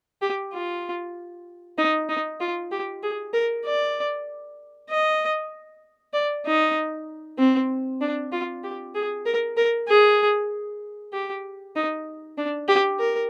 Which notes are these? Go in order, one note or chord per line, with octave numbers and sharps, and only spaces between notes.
G4
F4
D#4
D#4
F4
G4
G#4
A#4
D5
D#5
D5
D#4
C4
D4
F4
G4
G#4
A#4
A#4
G#4
G4
D#4
D4
G4
A#4